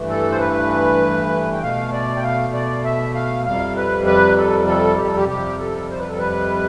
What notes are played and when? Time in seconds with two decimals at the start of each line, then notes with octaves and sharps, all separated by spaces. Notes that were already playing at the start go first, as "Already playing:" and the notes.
Already playing: G2 E3 A3
0.10 A4
0.32 C5
0.40 B4
1.53 G5
1.62 B2 A3 F5
1.93 D5
2.17 G5
2.23 F5
2.53 D5
2.84 E5
3.15 F5
3.46 F2 C3 G3 F5
3.77 B4
4.06 B4
4.37 A4
4.67 A4
4.98 G4
5.07 A4
5.17 G4
5.29 F2 C3 G3 G4
5.59 A4
5.91 C5
5.99 B4
6.09 A4
6.18 B4